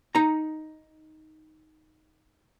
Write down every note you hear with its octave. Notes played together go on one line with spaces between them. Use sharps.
D#4 A#5